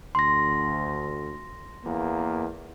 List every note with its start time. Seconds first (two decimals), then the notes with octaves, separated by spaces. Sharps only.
0.15 D2 C6 A#6
1.84 E2 A#3